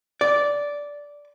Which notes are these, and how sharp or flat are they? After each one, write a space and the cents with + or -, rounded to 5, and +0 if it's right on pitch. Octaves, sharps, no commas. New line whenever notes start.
D5 -10